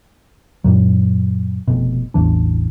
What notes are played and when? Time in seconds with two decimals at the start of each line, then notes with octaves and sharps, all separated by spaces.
0.64 F#2 A#2 F#3
1.68 F1 F2 B2
2.14 A1 E2 E3 D4